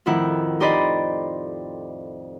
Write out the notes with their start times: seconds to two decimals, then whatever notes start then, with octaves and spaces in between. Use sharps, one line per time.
0.06 F2 A2 D#3 E4 F#5 G6
0.60 D#4 G4 C5 D5 D#5 B5